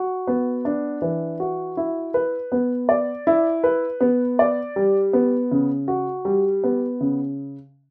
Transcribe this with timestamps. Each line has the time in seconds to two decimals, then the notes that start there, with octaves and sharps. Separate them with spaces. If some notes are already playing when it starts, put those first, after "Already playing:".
Already playing: F#4
0.27 B3
0.65 D4
1.02 E3
1.40 F#4
1.77 E4
2.14 B4
2.52 B3
2.89 D5
3.27 E4
3.64 B4
4.01 B3
4.39 D5
4.76 G3
5.13 B3
5.51 C#3
5.88 F#4
6.25 G3
6.64 B3
7.01 C#3